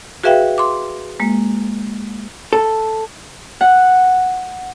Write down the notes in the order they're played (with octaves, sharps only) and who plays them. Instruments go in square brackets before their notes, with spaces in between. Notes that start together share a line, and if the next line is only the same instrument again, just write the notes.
[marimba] F#4 G#4 B4 E5 F5 G5
C6 D6
G#3 A#3
[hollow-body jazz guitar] A4
[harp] F#5